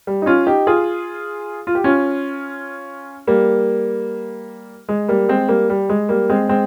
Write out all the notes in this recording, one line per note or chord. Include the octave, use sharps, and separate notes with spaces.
G3
D#4
C#4 F4
D#4 G4
F4 G#4
F4
G4
C#4 F4
G3 A#3
G#3
G3 A#3
G#3 C4
G3 A#3
G3
G#3
G3 A#3
G#3 C4
G#3 C4